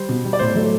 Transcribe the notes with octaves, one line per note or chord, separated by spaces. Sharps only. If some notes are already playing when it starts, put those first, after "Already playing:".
Already playing: G3 C5
B2
G3
D5
A2 C5
F#3 A3